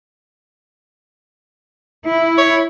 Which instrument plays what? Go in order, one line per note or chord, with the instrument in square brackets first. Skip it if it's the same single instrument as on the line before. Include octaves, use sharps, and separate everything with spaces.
[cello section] E4
[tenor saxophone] C#5